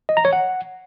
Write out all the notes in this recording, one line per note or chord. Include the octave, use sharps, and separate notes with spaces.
D#5
A#5
C#5
F#5